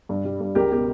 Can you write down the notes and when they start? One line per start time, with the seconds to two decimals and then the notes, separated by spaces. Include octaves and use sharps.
0.09 G2
0.25 G3
0.41 G2
0.55 C#2 G4 A#4
0.71 B2 G4